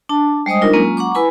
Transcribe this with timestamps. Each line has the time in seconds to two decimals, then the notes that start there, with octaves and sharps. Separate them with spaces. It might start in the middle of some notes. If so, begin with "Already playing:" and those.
0.09 D4 A5
0.46 G3 G#3 C5 D#5 D#6
0.62 D4 D#4 F4 A#4
0.73 F#3 G#3 A#3 C#4 F4
0.97 F#5 A#5 C#6 D6
1.15 E4 B4 G#5 B5